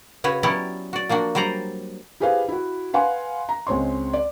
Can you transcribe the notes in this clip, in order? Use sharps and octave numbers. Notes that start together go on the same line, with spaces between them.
C#3 F#4 B4 C#5
F#3 B3 C#4 E4 G4 D5
F#4 D5
F3 A#3 D4 F#4
F#3 G3 C5 D5 A#5
E4 G4 G#4 B4 C5 F5
E4 F#4
B4 F5 F#5 G#5 C6
A#5
C#2 G#3 C4 C#5 C6
D5